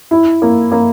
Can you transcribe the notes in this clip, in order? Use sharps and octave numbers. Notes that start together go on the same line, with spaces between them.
E4
A#3
A#3